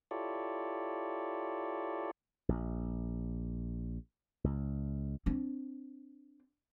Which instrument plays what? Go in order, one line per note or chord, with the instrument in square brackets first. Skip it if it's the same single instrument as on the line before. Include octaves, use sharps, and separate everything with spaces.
[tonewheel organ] E4 F4 G4 A4 C#5 D5
[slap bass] A#1
C#2
[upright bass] C4 D4